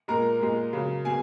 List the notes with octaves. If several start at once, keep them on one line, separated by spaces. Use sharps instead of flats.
A#2 G#3 A#4 A#5
A#2 G#3
C#3 F#3
B2 G#4 G#5